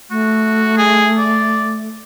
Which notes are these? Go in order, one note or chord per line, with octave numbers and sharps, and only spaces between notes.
A3 F#4
G#4
D5